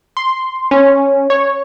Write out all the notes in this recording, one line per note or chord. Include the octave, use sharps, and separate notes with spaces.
C6
C#4
C#5